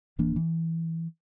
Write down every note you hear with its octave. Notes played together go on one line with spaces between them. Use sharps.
D1 E3 A#3 D4
E3